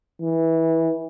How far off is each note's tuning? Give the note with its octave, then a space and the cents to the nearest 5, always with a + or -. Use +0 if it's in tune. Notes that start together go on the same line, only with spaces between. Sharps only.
E3 -15